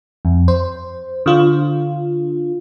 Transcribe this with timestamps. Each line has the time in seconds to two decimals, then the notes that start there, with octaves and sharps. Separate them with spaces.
0.25 F2
0.48 C5
1.26 D3 F4